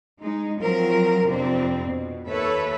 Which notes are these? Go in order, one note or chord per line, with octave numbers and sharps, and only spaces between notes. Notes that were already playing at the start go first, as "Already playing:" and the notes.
G#3 D#4
F3 F#3 C4 A#4
F2 C3 C4 D4
B2
D#2 A4 B4 C#5 E5